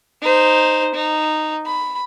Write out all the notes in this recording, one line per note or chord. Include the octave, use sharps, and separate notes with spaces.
D#4 C5
D#4
B5